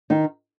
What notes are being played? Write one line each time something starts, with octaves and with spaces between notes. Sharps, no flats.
D#3 D#4